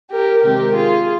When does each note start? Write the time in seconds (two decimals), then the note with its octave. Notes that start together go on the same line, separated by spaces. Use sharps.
0.11 G4 A#4
0.43 C3 D#3 G#3 C4 G4 A#4
0.75 F4 G#4